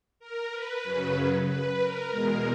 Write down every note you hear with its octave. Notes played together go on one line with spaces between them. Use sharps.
A#4
B4
F#2 C#3 F#3
B4
A#4
E2 B2 G#3